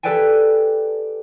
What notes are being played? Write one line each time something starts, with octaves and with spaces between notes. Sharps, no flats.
G4 A4 B4 D5 G5 G#5